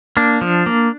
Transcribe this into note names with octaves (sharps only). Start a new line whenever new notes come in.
A#3 D4
F3
A#3